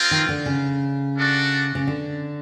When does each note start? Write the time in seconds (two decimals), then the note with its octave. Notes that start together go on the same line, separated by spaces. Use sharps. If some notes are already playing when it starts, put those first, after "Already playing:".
Already playing: G#3 C4 F4 A#4
0.11 D#3
0.29 D3
0.46 C#3
1.17 D4 F#4 A4 D5
1.75 C#3
1.87 D3